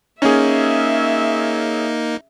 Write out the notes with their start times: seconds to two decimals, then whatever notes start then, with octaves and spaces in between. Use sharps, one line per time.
0.22 A#3 C#4 D#4 G#4 E5